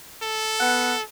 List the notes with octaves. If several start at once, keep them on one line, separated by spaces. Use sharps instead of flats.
A4
B3 F#5